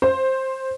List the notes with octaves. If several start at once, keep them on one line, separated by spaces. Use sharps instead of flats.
C5